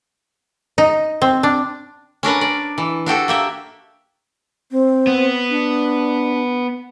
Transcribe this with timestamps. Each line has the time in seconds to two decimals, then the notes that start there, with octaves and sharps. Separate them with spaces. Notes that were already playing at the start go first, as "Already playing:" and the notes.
0.78 D#4
1.22 C4
1.43 D4
2.23 C#4 D4 A#4 B4
2.41 D5
2.78 E3
3.06 D4 F#4 G4 A4
3.28 A#3 G4 E5
4.71 C4
5.07 B3
5.50 D4